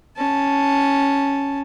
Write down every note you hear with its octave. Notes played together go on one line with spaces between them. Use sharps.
C#4 A5